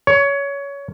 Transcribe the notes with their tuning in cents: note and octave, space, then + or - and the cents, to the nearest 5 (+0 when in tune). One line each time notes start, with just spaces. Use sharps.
C#5 +20